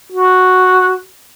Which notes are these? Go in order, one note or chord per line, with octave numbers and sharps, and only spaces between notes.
F#4